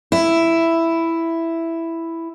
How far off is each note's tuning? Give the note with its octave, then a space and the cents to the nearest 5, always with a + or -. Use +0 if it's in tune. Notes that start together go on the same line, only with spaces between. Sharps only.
E4 +5